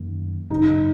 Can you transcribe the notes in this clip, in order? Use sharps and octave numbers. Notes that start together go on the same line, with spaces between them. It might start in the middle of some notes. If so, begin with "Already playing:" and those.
Already playing: F#2 D#3 A#3
G#1 F#2 C#3 D#4